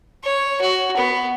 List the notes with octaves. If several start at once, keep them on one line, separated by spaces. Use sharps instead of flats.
C#5
F#4
B3